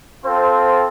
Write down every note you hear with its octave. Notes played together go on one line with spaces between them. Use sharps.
C4 F4 A4 C5